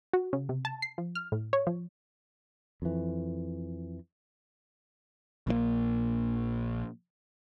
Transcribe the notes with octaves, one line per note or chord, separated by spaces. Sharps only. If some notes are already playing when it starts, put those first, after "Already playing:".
F#4
C#3
C3
A5
C7
F3
F6
A2
C#5
F3
F2 E3
A#1 A#2 D3 A#3